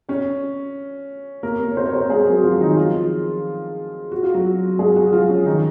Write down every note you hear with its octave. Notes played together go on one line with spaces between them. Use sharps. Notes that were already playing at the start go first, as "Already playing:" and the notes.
C#4 C#5
A#3 A#4
A#3 A#4
C#5
C4 C5
C#5
C4 C5
G#3 G#4
F#3 F#4
F3 F4
D#3 D#4
F3 F4
F#4
F4
F#3 F#4
G#3 G#4
F#3 F#4
F3 F4
C#4
D#3 D#4